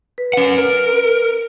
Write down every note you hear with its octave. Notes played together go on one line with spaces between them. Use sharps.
B4
C#4 F#5
A#4